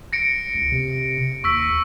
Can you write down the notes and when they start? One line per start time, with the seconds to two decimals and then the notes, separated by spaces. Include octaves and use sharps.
0.13 A#6 C#7 D7
0.55 C#2
0.72 C3
1.44 D#2 C#6 E6 B6